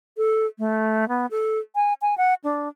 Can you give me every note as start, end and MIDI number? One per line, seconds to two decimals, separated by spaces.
0.17 0.46 69
0.59 1.08 57
1.08 1.26 59
1.31 1.59 69
1.75 1.93 80
2.02 2.17 80
2.18 2.34 78
2.44 2.69 62